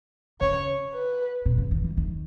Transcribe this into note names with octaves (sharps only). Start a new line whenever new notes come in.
C#3 C#5
B4
B2
C#3
D#3
E3
D#3